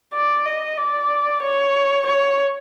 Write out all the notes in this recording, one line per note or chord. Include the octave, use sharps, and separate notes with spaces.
D5
D#5
D5
C#5
C#5